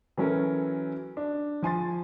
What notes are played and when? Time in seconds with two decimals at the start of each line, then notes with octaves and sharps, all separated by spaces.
0.17 E3 F#3 C#4 A4 A#4
1.17 D4
1.62 F3 G#5 C6 A6